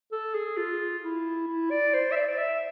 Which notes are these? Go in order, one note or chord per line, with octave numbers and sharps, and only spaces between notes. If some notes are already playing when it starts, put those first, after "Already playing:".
A4
G#4
F4
E4
E4
D5
C5
E5
D5
D5
E5